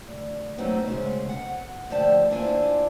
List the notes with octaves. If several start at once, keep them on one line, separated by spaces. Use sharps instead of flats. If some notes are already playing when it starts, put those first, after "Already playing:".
D2
F#3 A3 B3 C4 D#4 F#4
A2 C#3 G#3 C#4 C5
F#5
A2 D3 F3 G4 D5 A5
D#2 D4 E4 F4 C5 G#5